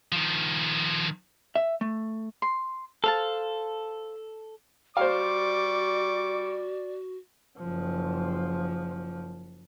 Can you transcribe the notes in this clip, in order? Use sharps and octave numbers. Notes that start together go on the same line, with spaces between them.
D#3 F3
E5
A3
C6
A4 C5 F5 A5
G3 F#4 C5 D5 F5 C#6 D6
F#1 F3